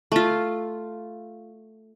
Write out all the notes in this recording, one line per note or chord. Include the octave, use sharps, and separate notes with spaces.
A3 F4